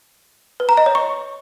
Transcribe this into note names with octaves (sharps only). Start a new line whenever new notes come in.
B4
A#5
D#5
C#5
C#6